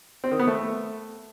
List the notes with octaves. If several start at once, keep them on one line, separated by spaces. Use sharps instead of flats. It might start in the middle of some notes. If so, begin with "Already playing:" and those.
C4
D#3
B3
A3